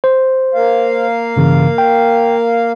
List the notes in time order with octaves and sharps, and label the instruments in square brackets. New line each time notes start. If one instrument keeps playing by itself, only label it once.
[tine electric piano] C5
[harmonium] A#3 F5
[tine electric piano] G2 C#3 E3
G5